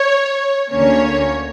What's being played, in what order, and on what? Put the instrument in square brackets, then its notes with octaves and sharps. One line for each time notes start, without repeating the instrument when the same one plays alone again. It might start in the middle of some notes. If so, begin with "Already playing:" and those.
Already playing: [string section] C#5
D2 D3 A#3 C#4 C#5